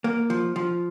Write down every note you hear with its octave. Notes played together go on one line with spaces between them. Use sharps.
A#3
F3
F3